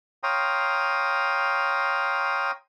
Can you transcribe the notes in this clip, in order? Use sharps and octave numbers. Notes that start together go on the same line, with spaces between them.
C#5 F5 G5 A#5 C6 D#6